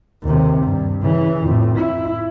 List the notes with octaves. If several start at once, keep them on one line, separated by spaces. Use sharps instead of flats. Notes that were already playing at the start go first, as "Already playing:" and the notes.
D#2 C3
G2
C#3 E3
F2 A2
E4